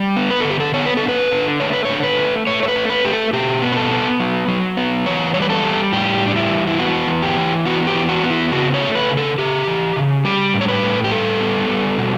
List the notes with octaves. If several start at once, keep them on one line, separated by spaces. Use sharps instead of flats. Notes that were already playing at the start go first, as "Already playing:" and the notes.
Already playing: G3
B3
B4
D3 A4
G4
A4
B3 C#5
B4
A4
D3
B4
D3
A3 C#5
B4
D3 C#5
B4
A3
A3 C#5
C#5
B4
A3
B4
A3 G4
A4
B2 G4
B3
B4
A4
B3
F#3
F#3
B3
E3 C#5
G3 C#5
B4
A4
G3
A2 G4
G3
D4
E4
E3
E4
B3 F#4
E3
G4
E3
B3 F#4
G4
E3
F#4
B3
E4
C#3 F#4
C#5
A3
B4
C#3
A4
C#3 G4
E3
C#3
G3 G4
A2
C#5
B4
A2
G4
G3 A4
B3
G3
B2